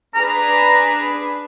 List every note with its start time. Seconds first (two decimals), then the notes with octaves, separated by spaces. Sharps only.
0.15 D4 G#4 B4 A#5